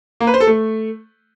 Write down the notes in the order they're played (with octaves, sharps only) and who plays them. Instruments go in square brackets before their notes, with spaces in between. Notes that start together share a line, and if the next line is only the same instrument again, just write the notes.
[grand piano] A#3
B4
C5
A4
A3